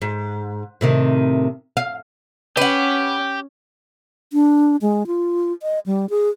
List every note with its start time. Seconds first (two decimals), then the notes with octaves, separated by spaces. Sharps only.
0.02 G#2
0.81 A2 C3 D#3
1.77 F5
2.57 C#4 G4 B4 F#5
4.33 D4
4.81 G#3
5.07 F4
5.63 D#5
5.86 G3
6.10 G#4